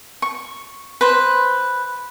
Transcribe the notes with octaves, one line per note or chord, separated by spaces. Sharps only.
C#6
B4 C5